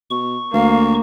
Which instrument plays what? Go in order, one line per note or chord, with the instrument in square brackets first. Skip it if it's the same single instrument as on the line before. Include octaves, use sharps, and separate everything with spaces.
[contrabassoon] B2 [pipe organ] C#6
[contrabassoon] D2 [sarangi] A#3 [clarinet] F5